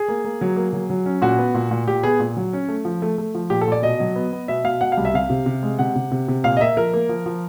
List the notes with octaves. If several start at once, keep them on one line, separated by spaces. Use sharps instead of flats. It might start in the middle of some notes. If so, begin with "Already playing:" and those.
Already playing: G#4
A#3
A#3
F#3
A#3
F#3
F#3
C#4
A#2 F#4
B3
A#2
A#2
A#2 G4
B3 G#4
A#2
F#3
C#4
A3
F3
A3
A3
F3
A#2 G4
A4
A#2 D5
B2 D#5
F#3
B3
B3
B2 E5
B2 F5
B2 F#5
F5
C2
E5
C3 F5
C3
C3
G#3
C3 F#5
C3
C3
C3
A#2 F5
D#5
A#3 E5
F3 A#4
A#3
F3
F3